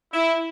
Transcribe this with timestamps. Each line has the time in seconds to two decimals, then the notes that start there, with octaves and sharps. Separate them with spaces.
0.13 E4